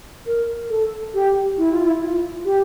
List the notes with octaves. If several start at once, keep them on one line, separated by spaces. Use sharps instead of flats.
A#4
A4
G4
E4
F4
E4
F4
G4